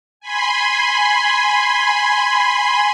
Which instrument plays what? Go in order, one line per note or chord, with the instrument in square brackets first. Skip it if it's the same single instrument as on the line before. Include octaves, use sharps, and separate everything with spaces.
[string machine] G#5 B5 C6